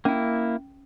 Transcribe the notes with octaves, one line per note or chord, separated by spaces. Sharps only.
A#3 C#4 E4